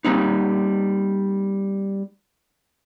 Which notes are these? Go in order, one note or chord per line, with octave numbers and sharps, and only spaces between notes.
G3 A#3 C4 D#4